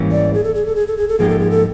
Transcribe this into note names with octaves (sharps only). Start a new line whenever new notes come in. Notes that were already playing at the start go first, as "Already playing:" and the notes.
Already playing: G#2 E3 G3 A#3 C#4
D5
G#4
A4
G#4
A4
G#4
A4
G#4
A4
G#2 F3 A#3 D#4 G4 G#4
A4
G#4
A4